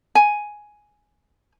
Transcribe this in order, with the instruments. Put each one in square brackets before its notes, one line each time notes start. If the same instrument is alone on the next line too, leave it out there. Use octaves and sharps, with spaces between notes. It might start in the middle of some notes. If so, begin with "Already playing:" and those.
[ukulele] G#5